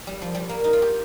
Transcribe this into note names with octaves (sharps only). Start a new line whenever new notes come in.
G3
F3
G3
A#3
D#4
F4
G4